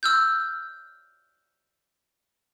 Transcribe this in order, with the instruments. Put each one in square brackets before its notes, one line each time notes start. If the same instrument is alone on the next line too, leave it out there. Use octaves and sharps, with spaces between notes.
[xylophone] E6 F6 G6